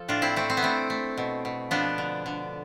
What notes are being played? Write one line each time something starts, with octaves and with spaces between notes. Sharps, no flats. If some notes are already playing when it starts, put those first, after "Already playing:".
Already playing: F3 A4
A2 D4 F4
C4 E4
A3 C4
C4
B3
A3 C4
A3
B2
B2
F3 B3 D4
D3
D3